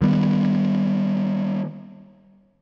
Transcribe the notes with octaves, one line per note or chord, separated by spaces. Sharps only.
D#3 G3 B3